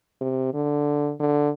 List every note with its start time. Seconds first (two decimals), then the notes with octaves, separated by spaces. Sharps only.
0.21 C3
0.54 D3
1.20 D3